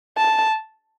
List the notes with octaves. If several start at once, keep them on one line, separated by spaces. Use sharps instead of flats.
A5